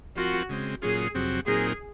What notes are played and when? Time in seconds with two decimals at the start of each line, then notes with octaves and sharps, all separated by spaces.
0.17 F3 C4 F4 F#4 A#4
0.49 C#3 G#3 C4
0.82 A#2 F#3 C#4 F4 G#4
1.14 F2 C3 F#3 C4 F#4
1.47 A#2 F#3 C4 D#4 G#4 A#4